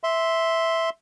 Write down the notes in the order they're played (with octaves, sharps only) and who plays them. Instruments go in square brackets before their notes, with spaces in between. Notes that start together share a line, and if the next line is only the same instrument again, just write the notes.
[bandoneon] E5 C6